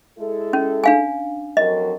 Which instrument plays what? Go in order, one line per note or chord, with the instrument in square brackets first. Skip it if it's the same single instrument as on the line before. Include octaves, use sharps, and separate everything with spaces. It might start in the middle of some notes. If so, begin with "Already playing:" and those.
[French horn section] G#3 E4 A4
[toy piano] C#4
D4 F5 G#5
[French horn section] F2 F#3 A#4 [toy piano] D#5